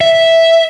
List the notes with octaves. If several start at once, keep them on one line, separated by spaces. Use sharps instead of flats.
E5